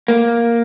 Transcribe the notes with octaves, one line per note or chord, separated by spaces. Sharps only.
A#3